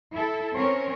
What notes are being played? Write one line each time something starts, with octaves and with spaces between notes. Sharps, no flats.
E4 A4
C4 C#4 A#4 C#5